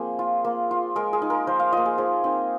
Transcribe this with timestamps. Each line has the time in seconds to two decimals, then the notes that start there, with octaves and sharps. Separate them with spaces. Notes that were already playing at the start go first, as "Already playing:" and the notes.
Already playing: F3 A#3 C4 G#4
0.19 F4
0.45 A#3
0.71 F4
0.96 G#3 A#4
1.13 G#4
1.22 D#4
1.30 A#4
1.47 F3 C5
1.60 F5
1.72 A#3 F4 D#5
1.86 G#4
1.98 F3 G#4
2.24 C4 D#4